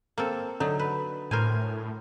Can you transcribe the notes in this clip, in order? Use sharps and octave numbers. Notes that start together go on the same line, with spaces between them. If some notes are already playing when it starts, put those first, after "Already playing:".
A#3 C4 A4
D3 F#3 D#4
B4
A2 A#4 C5 G#5